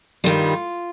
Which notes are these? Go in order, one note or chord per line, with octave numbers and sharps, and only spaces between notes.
G2 D#3 G3 F4